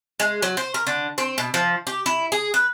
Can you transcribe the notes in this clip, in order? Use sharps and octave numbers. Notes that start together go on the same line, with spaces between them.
G#3
F#3
C5
A#4
D3
C4
B2
F3
G4
E4
G#4
B4